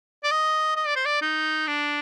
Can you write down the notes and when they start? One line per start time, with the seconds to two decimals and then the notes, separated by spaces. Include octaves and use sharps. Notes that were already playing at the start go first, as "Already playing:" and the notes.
0.24 D5
0.31 D#5
0.76 D#5
0.87 D5
0.96 C5
1.06 D5
1.22 D#4
1.67 D4